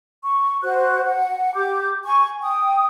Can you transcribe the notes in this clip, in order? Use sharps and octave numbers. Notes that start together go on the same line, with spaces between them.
C#6
F#4 C5 F#6
F#5
G4 D6 G6
G#5 C#6
G5 D#6